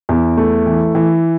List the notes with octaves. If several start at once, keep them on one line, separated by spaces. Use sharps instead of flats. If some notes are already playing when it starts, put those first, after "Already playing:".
E2
A3
E3
E3